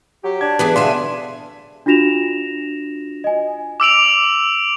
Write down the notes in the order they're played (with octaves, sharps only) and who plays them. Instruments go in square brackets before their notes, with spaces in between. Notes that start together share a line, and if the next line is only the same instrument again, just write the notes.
[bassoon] F#3 [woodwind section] G4
[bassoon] D4 [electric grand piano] G#6
[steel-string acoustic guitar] E3 B3 G#4 [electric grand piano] B4 D5 B6
[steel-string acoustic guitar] B2 E5 G#5 [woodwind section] D3 [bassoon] D4 [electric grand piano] F5 C6
[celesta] D4 F4 F#4 A#6 E7 F7
D#5 G#5
[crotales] D6 E6 D7 F7